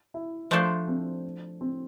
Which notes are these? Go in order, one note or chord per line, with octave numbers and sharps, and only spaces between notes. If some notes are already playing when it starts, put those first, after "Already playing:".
E4
F3 A3 D4 A4 C5
C4
C4